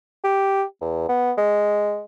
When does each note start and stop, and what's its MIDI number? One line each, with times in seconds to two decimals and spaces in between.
0.24 0.64 67
0.81 1.07 40
1.09 1.32 59
1.38 2.02 56